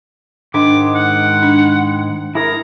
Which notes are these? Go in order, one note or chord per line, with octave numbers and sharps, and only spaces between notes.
G#2 D#3 G#3 D4 D6
F#5
D4
E4 G#4 A#4 A#5